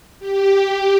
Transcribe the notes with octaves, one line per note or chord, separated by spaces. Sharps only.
G4